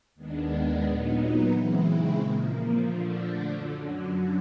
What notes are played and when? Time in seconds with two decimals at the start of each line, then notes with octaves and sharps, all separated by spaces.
0.15 D#2 D#3 G#3 B3 D4
0.82 A#2 F#3 B3 D#4
1.50 C#3 E3 G#3 C4 E4
2.18 A#2 F3 A#3
2.84 D3 F3 A3 D4
3.52 F#2 D3 F#3